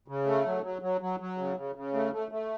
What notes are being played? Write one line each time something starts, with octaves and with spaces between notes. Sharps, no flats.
C#3
A3
F#3
F#3
F#3
F#3
F#3
C#3
C#3
C#3
A3
A3
A3